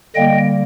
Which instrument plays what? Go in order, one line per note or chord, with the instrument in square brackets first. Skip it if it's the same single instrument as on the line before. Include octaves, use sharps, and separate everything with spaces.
[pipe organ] D3 G3 A#3 D#5 G5